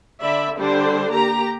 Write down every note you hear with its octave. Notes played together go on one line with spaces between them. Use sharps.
D3 D5 E5 B5
D3 G3 D4 A4 C5
A#3 G4 A#5